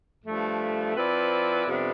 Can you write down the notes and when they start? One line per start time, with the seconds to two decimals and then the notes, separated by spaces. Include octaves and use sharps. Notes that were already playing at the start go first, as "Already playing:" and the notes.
0.24 G2 F3 A3
0.96 F3 C4 E4 B4 D5
1.67 F2 C3 G3 B3 D4